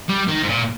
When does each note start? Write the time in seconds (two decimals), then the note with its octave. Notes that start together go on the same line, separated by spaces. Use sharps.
0.09 G3
0.28 D#3
0.43 G#2
0.47 A#2